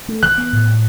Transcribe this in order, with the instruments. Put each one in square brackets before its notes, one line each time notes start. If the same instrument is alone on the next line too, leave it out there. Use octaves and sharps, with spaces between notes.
[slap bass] A3
[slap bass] E3 [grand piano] F#6
[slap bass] B3
A2
A2